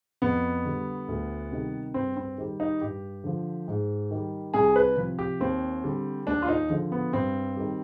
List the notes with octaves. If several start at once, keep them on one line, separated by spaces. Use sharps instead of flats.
F2 B3
D3 G3
D2
C3 D#3 G3
G2 C4
C4
D#3 G3
D#4
G2 G4
D3 F3
G#2
D#3 G3
C2 G#4
B4
C3 F3
G4
D#2 C4
D3 G3
D#2 D4
F4
D#4
D3 F3
B3
G2 C4
D#3 G3